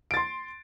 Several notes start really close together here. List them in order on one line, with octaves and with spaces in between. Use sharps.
D7 A6 C6